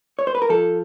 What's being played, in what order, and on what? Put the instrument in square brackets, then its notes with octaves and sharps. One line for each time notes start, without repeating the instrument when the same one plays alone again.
[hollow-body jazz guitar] C#5
C5
B4
A#4
F3 A4